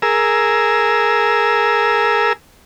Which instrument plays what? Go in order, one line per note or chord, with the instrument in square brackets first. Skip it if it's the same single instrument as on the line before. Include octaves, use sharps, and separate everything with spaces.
[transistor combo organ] G#4 A#4 E6